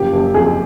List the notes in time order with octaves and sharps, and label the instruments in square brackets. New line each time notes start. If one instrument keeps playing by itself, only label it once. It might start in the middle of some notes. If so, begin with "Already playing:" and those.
Already playing: [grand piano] F#1 F3 G4
F#1
F2 G#4